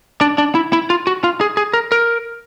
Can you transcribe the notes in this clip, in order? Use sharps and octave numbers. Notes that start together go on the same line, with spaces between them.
D4
D4
E4
E4
F4
F#4
F4
G#4
G#4
A#4
A#4